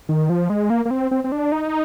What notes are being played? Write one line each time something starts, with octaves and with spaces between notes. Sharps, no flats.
D#3
F3
G#3
A#3
A#3
C4
C4
C4
D4
D#4